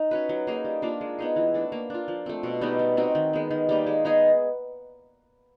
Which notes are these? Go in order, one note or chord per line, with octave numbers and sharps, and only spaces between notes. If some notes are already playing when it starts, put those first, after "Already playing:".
Already playing: D#4
C#4 F#4 B4
F#3
A#3 D#4 G#4
G3
A#3 D4 F4
G#3
B3 D#4 G#4
E3
A3 D4
A#3
D4 F4
F3
A3 C4
B2
G3 B3 D#4
G3
C4 D#4 F#4
D#3
G#3 B3
D#3
G3 A#3 D#4
G#3
B3 D#4 G#4